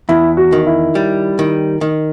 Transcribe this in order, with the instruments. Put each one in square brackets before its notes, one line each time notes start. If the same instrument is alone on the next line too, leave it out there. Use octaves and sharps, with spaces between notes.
[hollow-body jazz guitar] E2 [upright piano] E4
[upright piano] F#4
[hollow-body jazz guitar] D#3
[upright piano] E4
[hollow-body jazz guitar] G3
D#3
D#3